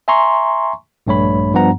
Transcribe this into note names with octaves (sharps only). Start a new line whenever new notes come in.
E5 G#5 A#5 C6 C#6
A#1 G2 A3 C#5 B5
G2 F3 B3 F#5 A#5